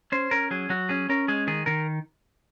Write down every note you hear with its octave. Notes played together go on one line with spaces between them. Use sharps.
C#4 C5
C#4 A#4
F#3 G#4
F#3 F#4
C#4 G#4
C#4 A#4
G#3 G#4
D#3 G#4
D#3 A#4